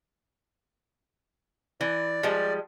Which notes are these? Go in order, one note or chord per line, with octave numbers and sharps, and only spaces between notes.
E3 D5
F3 G3 G#3